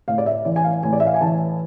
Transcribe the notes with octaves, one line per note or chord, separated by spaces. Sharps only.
A2 F5
D5
E5
E3 D5
G#5
F5
A2 G#5
D5
E5
F5
G#5
E3 A5